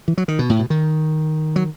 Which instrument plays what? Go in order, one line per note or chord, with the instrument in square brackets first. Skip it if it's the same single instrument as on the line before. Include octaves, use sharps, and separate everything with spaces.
[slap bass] E3
F#3
D#3
B2
A2
B2
D#3
F#3